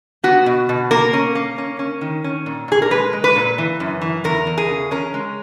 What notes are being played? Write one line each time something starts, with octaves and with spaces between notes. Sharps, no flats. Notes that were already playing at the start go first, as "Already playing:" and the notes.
B3 F#4
B2
B2
A#3 A#4
C#4
A#3
C#4
C#4
D#3
C#4
A#2
A#2 G#4
A#4
G#3 B4
G#3
B4
A#2
E3
F#2
E3
E2 A#4
E2
G#4
C#3
C#4 A#4
G#3